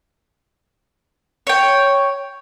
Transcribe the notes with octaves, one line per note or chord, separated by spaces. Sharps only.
C#5 G5